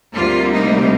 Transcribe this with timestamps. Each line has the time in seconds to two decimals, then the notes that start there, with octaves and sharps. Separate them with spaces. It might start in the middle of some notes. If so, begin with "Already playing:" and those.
0.13 D2 C3 G3 A#3 F4
0.52 D#4